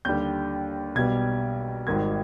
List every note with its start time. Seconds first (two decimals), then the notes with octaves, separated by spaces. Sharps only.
0.05 D#2 D3 G3 G6
0.95 B1 B2 G3 G#6
1.87 G#1 G#2 D#3 G3 G#6